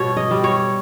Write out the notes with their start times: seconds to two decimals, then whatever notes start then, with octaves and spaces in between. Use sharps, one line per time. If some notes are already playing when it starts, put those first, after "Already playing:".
Already playing: B2 G3 C#5
0.17 D#5
0.31 G3
0.44 C#5